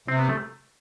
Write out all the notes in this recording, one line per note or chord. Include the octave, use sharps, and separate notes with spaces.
C3 C4
B3
A3